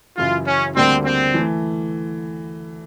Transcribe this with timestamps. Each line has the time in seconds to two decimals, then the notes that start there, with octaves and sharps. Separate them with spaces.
0.17 F#2 C#3 E3 F4
0.47 C#4
0.76 D2 D3 G3 A#3 C4 D4
1.05 C4
1.34 E3 A3